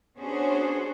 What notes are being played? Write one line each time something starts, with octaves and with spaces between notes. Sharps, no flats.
B3 C#4 D4 F#4 G#4 C5